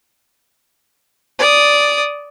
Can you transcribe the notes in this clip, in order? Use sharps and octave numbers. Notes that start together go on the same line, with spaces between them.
D5 D#6